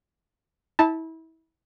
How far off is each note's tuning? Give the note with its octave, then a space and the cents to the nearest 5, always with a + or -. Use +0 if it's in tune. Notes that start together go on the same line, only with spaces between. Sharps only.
E4 -30 A5 +0